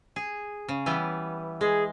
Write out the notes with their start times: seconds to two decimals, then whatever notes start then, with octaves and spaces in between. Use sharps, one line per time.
0.16 G#4
0.69 C#3
0.86 E3 G3 B3
1.61 G#3 G#4